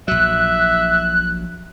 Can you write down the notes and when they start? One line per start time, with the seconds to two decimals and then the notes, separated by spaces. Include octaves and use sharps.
0.08 A#1 F#3 E5 F#6